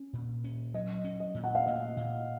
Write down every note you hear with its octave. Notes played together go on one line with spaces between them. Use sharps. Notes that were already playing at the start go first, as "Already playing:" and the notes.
Already playing: C#4
A#2
C#4
F#3 D#5
C#4
D#5
A#2
F#5
F5
A#2 D#5
A#2